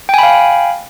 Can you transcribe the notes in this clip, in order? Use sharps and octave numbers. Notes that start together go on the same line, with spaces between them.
F5 G5 G#5 B5